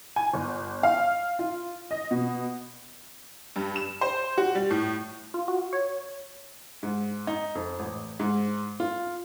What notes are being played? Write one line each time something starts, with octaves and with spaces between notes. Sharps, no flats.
G#5
G1
F5
F4
D#5
B2
G2
E7
C5
F#4
G3
A2
F4
F#4
C#5
G#2
D#4
F2
A1
G#2
F4